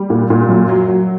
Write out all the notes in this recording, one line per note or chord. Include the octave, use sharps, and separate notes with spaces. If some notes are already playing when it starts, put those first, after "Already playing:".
Already playing: G3
A#2
A#2
F#2
F#3
F#3